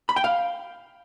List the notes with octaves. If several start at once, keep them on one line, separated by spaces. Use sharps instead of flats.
B5
G5
F5